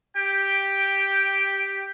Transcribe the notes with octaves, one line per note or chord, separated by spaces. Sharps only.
G4 G5